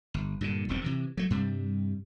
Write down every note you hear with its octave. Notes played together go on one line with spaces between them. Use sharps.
G1
G2 A#2 D3
E1 B1 A#2 C4
C3 E3
F#3 A3
G2 C3 G3